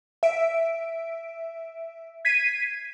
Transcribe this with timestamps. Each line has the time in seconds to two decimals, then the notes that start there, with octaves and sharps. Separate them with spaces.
0.23 E5 D7
2.25 G#6 B6 C7 D#7